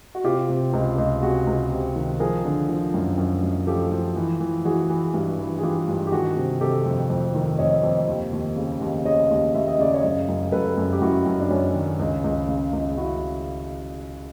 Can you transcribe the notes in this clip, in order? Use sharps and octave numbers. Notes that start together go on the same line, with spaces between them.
F#4
C3 F4 G4
C3
C#2
C#2
C3 F#4 G#4
C#2
C3
D#3
F3 G#4 A#4
D3
F3
F#2
F#2
F#2
F3 G4 A4
F3
E3
E3
E3 F#4 G#4
E3
G2
E3
G#4
E3 F4 G4
G2
G4
D#3 F#4 G#4
C3
C3 G4 A4
F2
F2
D#3
F2 C#5 D#5
F2
D#2
D#2
C#3
D#2
C#3 C#5 D#5
D#2
D#2 E5
D#5
C#3 D5
C#5 D#5
F#2
F#2
F#2 A4 B4
F#2
G4
F#2 E4 F#4
F#2
D4
F#2 C#4
D#3
C#2
C#2
C#3
C#2
C#3 E4 F#4